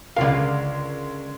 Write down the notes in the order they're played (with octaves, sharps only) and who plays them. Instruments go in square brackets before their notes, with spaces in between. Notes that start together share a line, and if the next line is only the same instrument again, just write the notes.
[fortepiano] C#2 A#4 [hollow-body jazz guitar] D3 F5